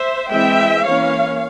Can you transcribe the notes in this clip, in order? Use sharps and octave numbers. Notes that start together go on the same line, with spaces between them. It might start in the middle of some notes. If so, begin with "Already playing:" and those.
Already playing: C5 E5
E3 G#3 C4 E5 G5
E3 A#3 C#4 C#5 F5